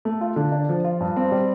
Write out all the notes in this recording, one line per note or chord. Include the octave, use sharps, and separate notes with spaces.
A3
F4
D3
D4
F3
F4
G2
C4
G3